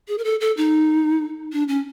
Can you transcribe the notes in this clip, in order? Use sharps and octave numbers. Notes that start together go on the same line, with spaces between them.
G#4
A#4
A4
A4
D#4
D4
C#4